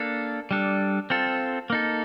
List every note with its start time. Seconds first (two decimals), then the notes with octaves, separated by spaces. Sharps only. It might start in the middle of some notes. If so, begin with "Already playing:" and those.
Already playing: A#3 D4 A4
0.51 G3 D4 A4
1.10 C4 F4 A4
1.70 A#3 D#4 A4